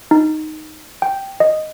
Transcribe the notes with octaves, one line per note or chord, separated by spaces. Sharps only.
D#4
G5
D#5